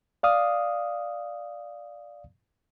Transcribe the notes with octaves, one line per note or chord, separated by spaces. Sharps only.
D5 F5 D#6